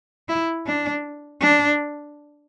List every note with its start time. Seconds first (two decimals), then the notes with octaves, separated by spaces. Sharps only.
0.29 E4
0.66 D4
1.41 D4